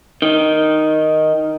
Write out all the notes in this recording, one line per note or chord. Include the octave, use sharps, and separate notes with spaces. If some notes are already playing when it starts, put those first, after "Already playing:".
D#3